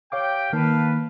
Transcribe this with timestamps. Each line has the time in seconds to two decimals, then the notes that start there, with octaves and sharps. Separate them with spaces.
0.12 G4 C#5 F5 G5 D6
0.53 D#3 A#3 B4 F5 A5